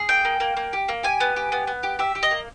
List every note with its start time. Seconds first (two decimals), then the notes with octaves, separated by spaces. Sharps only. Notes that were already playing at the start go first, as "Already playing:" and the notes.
Already playing: G#4
0.09 A#3 G5
0.25 A#3
0.40 A#3
0.57 A#3
0.73 G4
0.89 A#3
1.03 G4 G#5
1.20 B3
1.36 G4
1.52 B3
1.67 B3
1.83 G4
1.99 G4 E5
2.15 G4
2.23 D#5
2.31 A#3